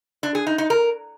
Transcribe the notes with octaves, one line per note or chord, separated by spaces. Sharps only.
D4
G#4
D#4
D#4
A#4